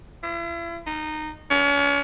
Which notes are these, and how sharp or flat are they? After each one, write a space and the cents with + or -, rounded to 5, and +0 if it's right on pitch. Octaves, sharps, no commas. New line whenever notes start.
E4 +40
D#4 -15
C#4 +40